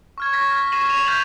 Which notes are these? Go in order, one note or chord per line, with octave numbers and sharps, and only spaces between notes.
C#6 F6 G#6
C#6 G#6 A#6 B6
F6
C#6 A#6 C7 D#7 E7 F#7
B6 D#7 F7
F6 G6 A6 B6 F7 F#7